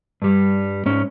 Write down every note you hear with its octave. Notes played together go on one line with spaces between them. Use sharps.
G2 G3
G#2 C#4